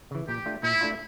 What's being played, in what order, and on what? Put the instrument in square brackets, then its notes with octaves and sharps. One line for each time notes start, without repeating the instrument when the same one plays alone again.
[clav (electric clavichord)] C#3 E3
[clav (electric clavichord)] A#2 [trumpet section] G4
[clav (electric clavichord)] A3 D4 F4
[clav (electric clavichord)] A#2 [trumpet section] E4
[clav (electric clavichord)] A3 D4 F4